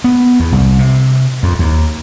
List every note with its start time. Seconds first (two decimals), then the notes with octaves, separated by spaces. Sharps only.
0.04 B3
0.40 E2
0.52 C2
0.79 C3
1.43 F2
1.59 D#2